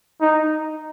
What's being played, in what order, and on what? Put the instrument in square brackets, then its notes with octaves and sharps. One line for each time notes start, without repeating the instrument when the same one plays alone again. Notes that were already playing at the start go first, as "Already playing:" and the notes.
[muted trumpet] D#4